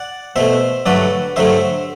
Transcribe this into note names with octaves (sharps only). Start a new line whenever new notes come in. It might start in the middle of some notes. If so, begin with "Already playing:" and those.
Already playing: D5 F#5
B2 A3 C5 E5
G2 D3 F#3 A3 B4 D5
G2 D3 F#3 A3 C5 E5